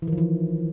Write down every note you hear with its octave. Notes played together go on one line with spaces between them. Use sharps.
E3
D#3
F3
E3